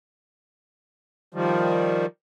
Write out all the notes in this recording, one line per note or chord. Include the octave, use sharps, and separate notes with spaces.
D#3 F3 G3